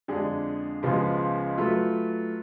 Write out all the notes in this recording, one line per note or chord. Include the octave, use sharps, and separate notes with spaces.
F2 D3 G#3 D4 G#4
C#2 C#3 F3 G#3 B3
F#3 A3 F4 B4